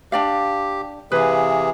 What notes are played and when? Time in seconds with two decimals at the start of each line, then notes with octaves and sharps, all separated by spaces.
0.12 D4 G4 D5 F5
1.12 C3 E3 G#4 B4 F5